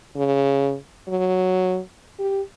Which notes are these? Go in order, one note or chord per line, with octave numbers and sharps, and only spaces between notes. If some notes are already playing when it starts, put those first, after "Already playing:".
C#3
F#3
G4